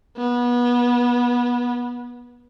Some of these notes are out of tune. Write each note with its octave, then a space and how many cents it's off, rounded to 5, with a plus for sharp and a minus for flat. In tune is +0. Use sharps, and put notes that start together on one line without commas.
B3 -25